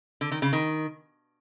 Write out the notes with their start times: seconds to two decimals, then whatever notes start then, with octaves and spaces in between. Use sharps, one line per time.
0.21 D3
0.32 D#3
0.42 C#3
0.53 D#3